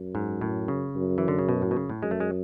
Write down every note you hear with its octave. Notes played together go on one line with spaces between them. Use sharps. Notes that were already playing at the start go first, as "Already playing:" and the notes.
Already playing: F#2
G#2
A2
C#3
F#2
E3
D3
C#3
B2
A2
B2
C#3
A2
F#2 G#3
A3
G#3